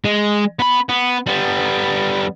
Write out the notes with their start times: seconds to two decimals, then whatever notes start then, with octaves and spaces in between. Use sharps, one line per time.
0.05 G#3
0.59 B3 B5
0.89 B3
1.27 G3 B3